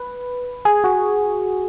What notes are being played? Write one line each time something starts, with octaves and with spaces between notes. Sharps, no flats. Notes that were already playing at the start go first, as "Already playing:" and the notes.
Already playing: B4
G#4
F#4